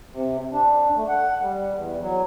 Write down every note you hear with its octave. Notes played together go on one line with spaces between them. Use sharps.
C3
D4
A3
F#5
G3
E2
F#3